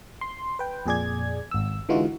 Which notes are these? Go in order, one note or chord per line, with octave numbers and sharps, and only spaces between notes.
C6
B4 G5
F2 A#2 G#4 D5 G#6
G#1 E6
D3 E3 G#3 D#4 F4 F#4